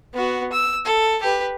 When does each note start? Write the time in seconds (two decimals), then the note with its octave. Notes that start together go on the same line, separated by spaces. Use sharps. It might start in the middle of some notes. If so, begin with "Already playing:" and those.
0.14 B3 F#4
0.52 E6
0.85 A4
1.22 G4 B4